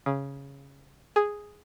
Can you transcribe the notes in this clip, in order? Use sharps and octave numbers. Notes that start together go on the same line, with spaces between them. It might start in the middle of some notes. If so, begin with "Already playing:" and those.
C#3
G#4